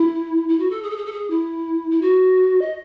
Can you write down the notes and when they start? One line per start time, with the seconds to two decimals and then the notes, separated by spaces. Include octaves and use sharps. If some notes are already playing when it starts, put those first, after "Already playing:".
Already playing: E4
0.48 E4
0.59 F#4
0.70 A4
0.82 G#4
0.90 A4
0.97 G#4
1.05 A4
1.12 G#4
1.30 E4
1.91 E4
2.01 F#4
2.61 D#5